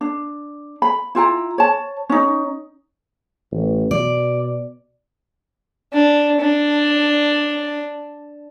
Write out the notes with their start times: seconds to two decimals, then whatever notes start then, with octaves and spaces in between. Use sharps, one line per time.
0.01 D4
0.82 B5
1.15 E4 F4 G5 A#5
1.58 C#5 A5
2.09 C#4 D#4
3.52 A1
3.91 B2 D5
5.93 D4
6.41 D4